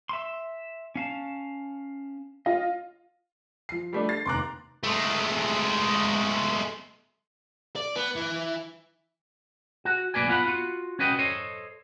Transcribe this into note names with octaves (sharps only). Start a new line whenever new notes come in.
E5 C6
C#4 F5 A5
F4 D#5
F3 C7
G3 A3 D4
A6 C7
F1 D#2 A#5 C6 D6 F#6
G#3 A3
D5
B3
E3
F#4
B1 C3 A#3 B4 D5 G#5
B3 F4 F5 F#5 B5
F4 F#4
C#4 F#4 B4 D#5 G5
A4 C5 C#5 D#5